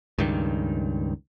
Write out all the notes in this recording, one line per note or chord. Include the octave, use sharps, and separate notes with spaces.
C#2 G2 D#3